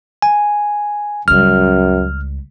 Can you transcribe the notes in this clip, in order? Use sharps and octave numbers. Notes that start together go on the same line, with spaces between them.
G#5
C#2 F#2 G3 F6